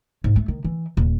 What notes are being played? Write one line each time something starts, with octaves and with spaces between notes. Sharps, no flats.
G#2
A3
D#3
E3
D#1